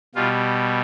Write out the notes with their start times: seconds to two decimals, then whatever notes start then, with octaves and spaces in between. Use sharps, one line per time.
0.15 B2 G3 F4